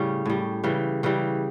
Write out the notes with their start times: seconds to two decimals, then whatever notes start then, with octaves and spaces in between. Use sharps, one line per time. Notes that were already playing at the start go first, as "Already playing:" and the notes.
Already playing: A2 C#3 G3 C#4
0.26 A2 G3
0.64 C#3 E3 G3
1.03 C#3 E3 G3